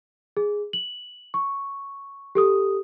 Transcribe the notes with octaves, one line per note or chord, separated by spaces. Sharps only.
G#4
F#7
C#6
G4 A4 D#6